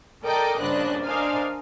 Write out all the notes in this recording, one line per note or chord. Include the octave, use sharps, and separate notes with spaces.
A4 A#4 D5 D#5 G5 D6
A#1 G2 C#3 D4 D#5 F#6
D4 A#4 C5 D#5 F5 G#5